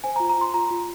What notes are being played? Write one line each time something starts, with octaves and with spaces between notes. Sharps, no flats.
C5 G#5
A#5
F4
A#5
F4 C6
F4 A#5
F4